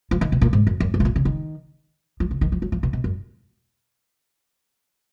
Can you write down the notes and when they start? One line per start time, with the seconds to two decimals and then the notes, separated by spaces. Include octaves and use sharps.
0.11 F3
0.21 D#3
0.32 B2
0.41 A#2
0.53 G#2
0.67 F#2
0.80 F#2
0.94 G#2
1.00 B2
1.05 A#2
1.16 C#3
1.25 D#3
2.20 F3
2.31 C#3
2.41 D#3
2.52 F3
2.62 F#3
2.72 F3
2.83 B2
2.93 B2
3.04 F#2